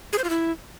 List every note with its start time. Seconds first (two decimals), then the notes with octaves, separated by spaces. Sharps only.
0.13 G#4
0.18 C5
0.24 F4
0.30 E4